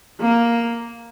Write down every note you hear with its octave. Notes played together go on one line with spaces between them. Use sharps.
A#3